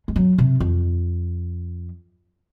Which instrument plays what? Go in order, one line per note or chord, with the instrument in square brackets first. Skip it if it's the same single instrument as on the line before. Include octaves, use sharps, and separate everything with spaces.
[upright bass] G#3
F#3
C3
F2